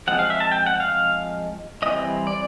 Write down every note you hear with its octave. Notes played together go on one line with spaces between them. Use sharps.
F3 G#3 C4 F#5
F5
E5
A5
G5
F#5
F5
E3 G3 C4 D#5
D5